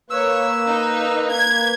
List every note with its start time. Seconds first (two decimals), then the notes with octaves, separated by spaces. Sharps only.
0.10 A#3 B4 C#5 E6
0.67 D#4
1.32 G#6